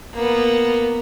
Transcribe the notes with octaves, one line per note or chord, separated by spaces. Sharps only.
A#3 B3